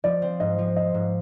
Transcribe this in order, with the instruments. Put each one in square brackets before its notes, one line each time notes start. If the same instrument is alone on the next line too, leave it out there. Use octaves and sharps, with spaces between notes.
[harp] F3 [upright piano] D5
[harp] C4
[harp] G#2 [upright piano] D#5
[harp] F3
[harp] C4 [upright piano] D#5
[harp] G#2